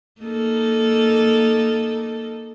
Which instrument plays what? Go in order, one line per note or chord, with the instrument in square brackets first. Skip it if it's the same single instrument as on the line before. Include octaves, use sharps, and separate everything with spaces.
[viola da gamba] A#3 D#4 A4